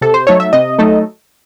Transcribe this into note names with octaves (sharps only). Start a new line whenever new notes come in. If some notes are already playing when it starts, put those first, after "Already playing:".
C3 A4
C5
F#3 A3 D#4 A4 C#5
E5
C3 D#5
F#3 A3 D#4 A4